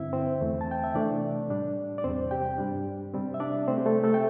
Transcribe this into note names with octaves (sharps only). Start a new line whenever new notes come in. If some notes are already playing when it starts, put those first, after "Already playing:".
Already playing: G2 D3 C4 E4 E5
C4 C5
E2 E3 A3
A5
G5
E5
C3 E3 A3 D4 D5
A2 G3 D4
D5
E2 C3 G3 C4 C5
G4 G5
G2 G3 D4
C3 G3 C4
E5
D4 D5
C3 A3 C4 C5
G4
A3 A4
A3 A4
G5